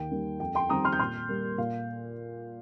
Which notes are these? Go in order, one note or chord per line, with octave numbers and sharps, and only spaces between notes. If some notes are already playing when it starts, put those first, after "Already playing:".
Already playing: D#2 G5
D#3 G3 A#3
F2 G5
G5 C6
D#3 G3 C4 A#5 D#6
C6 F6
G6
A#2 C6 F6
G3 A#3
A#2 F5